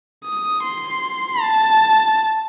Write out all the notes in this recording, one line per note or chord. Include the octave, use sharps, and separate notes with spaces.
D#6
C6
A5